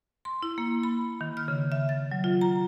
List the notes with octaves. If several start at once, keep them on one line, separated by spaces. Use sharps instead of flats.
C6
E4
A#3
B5
D#3
F6
C#3
E5
A6
F#3
F4
A#5